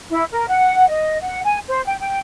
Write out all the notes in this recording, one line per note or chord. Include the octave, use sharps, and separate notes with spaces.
E4
A#4
F#5
D#5
F#5
G#5
C5
G5
G5